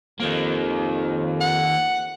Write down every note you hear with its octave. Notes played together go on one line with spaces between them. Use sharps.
F2 D#3 A#3
F#5